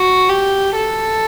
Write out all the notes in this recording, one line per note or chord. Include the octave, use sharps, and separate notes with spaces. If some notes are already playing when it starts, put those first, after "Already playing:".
Already playing: F#4
G4
A4